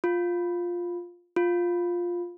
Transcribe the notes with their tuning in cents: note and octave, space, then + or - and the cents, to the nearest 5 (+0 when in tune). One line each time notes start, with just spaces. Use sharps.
F4 +5
F4 +5